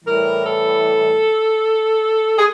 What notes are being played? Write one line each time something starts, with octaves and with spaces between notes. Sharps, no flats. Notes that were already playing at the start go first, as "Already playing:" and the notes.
A2 E3 G3 A#4
A4
G#4